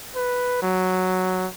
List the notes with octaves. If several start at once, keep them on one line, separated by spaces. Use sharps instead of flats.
B4
F#3